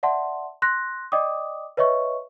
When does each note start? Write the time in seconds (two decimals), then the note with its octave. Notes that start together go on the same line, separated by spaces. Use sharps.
0.03 D5 E5 F#5 A5 C6
0.62 C6 F#6 A#6
1.12 D5 D#5 G5 D6 D#6
1.77 B4 C#5 D#5 E5 C#6